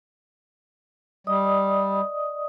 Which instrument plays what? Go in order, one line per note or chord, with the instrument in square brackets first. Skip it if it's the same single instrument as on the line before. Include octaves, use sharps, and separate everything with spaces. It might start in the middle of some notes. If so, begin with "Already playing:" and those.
[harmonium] G3 [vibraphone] D5 D#5 D#6